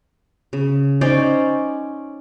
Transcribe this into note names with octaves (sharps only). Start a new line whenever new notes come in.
C#3
C#4 D#4 C5 D5